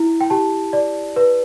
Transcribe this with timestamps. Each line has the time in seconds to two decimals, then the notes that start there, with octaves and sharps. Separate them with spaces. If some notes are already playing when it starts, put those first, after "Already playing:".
Already playing: E4
0.21 G5
0.30 G4 A5
0.73 D5
1.16 B4